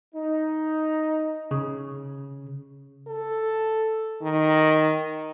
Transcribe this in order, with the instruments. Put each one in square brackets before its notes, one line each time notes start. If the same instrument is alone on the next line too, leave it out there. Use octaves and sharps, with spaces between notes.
[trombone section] D#4
[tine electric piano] C#3
[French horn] A4
D#3